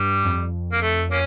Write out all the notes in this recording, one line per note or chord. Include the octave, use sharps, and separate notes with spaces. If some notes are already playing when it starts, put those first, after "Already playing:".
Already playing: G2 G3
F2
A#3
A3
A#3 C#4